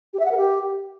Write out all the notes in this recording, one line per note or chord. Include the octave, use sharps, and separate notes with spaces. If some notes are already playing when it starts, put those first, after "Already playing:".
G4
E5
F#5
A#4
G4